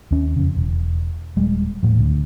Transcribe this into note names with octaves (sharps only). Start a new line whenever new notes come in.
D#2 C#4
F2 C#3
E1
D#1 G3 G#3
D#1 A2 F3
D2